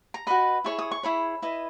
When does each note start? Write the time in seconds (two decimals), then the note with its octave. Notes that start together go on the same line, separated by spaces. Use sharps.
0.14 A#5
0.27 F#4 B4 D#5 B5
0.64 E4 G#4 C#5 C#6
0.79 D#6
0.91 C#6
1.03 E4 G#4 C#5 B5
1.42 E4 B4 D#5